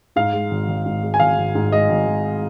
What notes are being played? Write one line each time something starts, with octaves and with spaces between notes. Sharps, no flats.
G#2 F5
G#3
G#1
G#1
G#2
G#3
G#5
G#1 F5
G#1
G#2
G#3 D#5
G#1
G#1